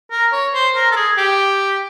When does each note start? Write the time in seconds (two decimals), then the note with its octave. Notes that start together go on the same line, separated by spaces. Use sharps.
0.11 A#4
0.33 C#5
0.54 C5
0.76 A#4
0.92 A4
0.96 G#4
1.18 G4